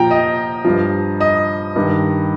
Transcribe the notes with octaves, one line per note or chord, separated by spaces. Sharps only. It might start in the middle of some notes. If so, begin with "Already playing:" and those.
Already playing: A#2 F3 G5 A#5
D#5
G2 F3
D#5
G2 D#3